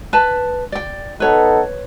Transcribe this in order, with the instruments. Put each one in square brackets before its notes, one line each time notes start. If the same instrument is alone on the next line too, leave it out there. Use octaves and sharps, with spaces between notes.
[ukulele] B4 A5
D5 G5
[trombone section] B3 D#4 A4 [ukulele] B4 C#5